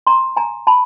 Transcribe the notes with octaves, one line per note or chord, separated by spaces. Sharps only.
A#5 C6
G#5 A#5
A5 B5